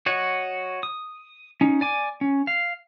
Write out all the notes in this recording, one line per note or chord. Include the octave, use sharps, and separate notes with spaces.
F#4 C#5 D#5 F#5
D#6
C#4 D#4
D5 G#5 D6
C#4
F5